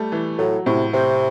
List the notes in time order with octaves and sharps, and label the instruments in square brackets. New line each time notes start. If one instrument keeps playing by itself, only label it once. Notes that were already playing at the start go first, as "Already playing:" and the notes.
Already playing: [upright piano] G3 A3
E3
[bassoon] A2 [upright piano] F#3
[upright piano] A2 [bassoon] C3
[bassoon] C3 [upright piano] C4